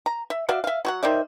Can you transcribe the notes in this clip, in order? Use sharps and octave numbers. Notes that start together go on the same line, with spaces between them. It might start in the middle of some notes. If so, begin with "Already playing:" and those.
A#5
E5
F#4 D5 E5 F5
E5 F5
F#3 F#4 F#5
D#3 C5 D5 E5